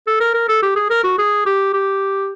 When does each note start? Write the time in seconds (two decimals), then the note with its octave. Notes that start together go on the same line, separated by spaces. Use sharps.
0.07 A4
0.20 A#4
0.34 A#4
0.49 A4
0.63 G4
0.76 G#4
0.90 A#4
1.04 F#4
1.18 G#4
1.46 G4
1.73 G4